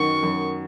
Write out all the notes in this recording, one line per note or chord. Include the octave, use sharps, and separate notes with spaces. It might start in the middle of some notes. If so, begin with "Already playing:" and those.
Already playing: F#2 B2 D#3 C#6
F#2